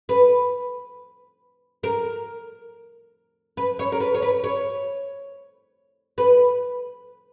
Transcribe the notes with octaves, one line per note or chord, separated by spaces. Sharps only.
B4
A#4
B4
C#5
A#4
B4
C#5
B4
C#5
B4